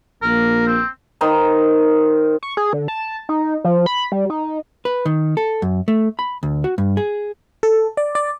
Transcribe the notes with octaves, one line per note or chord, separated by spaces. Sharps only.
A#1 A#3 A#4
C4
D#3 C5 D#5 A#5
C#6
G#4
D3
A5
D#4
F3
B5
G3
D#4
B4
D#3
A4
F#2
A3
B5
D2
F#4
G2
G#4
A4
D5
D5